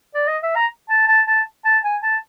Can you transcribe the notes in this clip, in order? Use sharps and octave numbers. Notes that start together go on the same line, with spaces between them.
D5
D#5
E5
A#5
A5
A5
A5
A5
G#5
A5